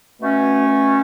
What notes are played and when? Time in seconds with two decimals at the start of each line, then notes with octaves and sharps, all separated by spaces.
0.20 B2 A3 C#4
0.67 B2